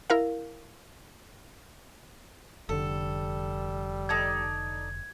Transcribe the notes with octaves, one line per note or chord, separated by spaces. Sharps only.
E4 A#4 F5
F1 D3 G3 A4
D#4 A4 D5 G#6